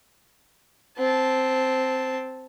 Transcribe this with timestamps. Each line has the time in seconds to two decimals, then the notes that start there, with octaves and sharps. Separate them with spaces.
0.98 C4 A5